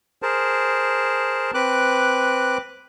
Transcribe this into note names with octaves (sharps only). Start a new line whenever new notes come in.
G#4 A#4 C5 A5
C4 B4 D6 F#6